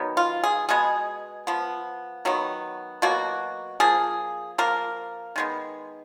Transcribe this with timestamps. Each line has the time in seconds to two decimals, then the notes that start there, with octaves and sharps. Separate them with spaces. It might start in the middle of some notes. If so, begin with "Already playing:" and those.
Already playing: D#3 F#3 B3
0.17 F4
0.44 G#4
0.69 B2 G#3 B3 G#4
1.47 F3 B3
2.25 D#3 F#3 B3
3.02 B2 F#3 A#3 F#4
3.80 F3 A#3 G#4
4.58 F3 A#3 A#4
5.36 D#3 G#3 B3